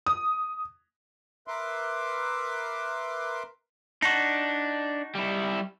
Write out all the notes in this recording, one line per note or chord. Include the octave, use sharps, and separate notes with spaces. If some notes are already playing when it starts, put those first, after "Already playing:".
D#6
A#4 B4 E5 C6 D6
D4 D#4 F#4
G3 E4